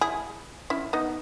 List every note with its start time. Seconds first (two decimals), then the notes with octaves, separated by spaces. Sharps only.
0.01 E4 G#4
0.70 C#4 E4
0.93 B3 D#4